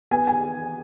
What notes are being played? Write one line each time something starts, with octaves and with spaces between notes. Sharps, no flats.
B3 G#5
G#5